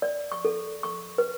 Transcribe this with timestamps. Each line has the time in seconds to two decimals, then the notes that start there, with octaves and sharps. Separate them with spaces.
0.02 D5
0.32 C#6
0.45 A4
0.83 C#6
1.18 B4